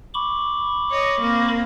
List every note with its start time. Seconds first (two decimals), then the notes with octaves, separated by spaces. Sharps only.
0.14 B5 C#6 D6
0.91 C#5 D#5
1.20 A#3 C4